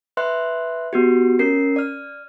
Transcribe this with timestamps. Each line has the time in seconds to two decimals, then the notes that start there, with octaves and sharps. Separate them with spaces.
0.17 B4 E5 C6 F#6
0.93 B3 F#4 G4
1.39 C#4 A#4 C7
1.76 D5 F6